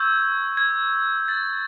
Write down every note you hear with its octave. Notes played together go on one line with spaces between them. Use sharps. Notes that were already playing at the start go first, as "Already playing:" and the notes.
Already playing: C#6 E6 G6 G#6
G#6
A6